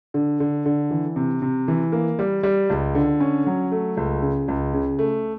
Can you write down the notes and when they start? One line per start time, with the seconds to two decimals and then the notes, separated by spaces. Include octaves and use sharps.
0.14 D3
0.40 D3
0.66 D3
0.91 E3
1.16 C3
1.42 C3
1.68 E3
1.92 A#3
2.19 G3
2.43 G3
2.70 C#2
2.95 D3
3.20 C#4
3.47 F#3
3.72 A3
3.97 C#2
4.22 C#3
4.48 C#2
4.73 C#3
4.99 A3